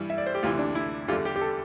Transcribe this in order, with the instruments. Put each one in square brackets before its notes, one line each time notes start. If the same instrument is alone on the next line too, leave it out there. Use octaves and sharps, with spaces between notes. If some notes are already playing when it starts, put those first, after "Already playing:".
Already playing: [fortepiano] G2 E3 G3
E5
D5
C5
G4
D2 C3 E3 F4
D4
E4
E2 D3 G3 F4
G4
G4
A4